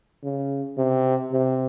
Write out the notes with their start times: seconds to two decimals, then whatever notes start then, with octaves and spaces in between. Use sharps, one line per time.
0.24 C#3
0.78 C3
1.32 C3